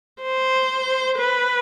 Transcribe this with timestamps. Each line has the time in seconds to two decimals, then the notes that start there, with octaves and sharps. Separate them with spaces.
0.22 C5
1.19 B4